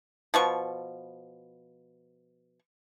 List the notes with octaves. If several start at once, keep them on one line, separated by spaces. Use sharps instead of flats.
B2 F3 C#6